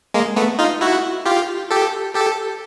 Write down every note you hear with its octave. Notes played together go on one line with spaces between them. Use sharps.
G#3 A#3
A3 B3
D#4 F4
E4 F#4
F4 G4
G4 A4
G4 A4